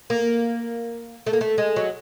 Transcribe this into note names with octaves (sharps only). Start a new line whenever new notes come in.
A#3
A3
A#3
A3
G#3
F#3